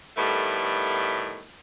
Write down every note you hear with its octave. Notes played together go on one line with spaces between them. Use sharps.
A2 D#3 G3 A3 B3